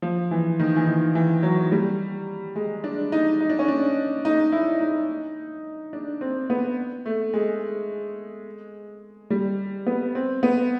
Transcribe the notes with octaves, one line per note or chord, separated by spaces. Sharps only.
F3
E3
D#3
E3
D#3
E3
F#3
G3
G#3
D4
D#4
D#4
D4
C#4
D4
D#4
E4
D#4
D4
C4
B3
A3
G#3
G3
B3
C4
B3